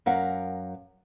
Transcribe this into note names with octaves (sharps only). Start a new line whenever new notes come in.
F#2 A#4 F5 F#5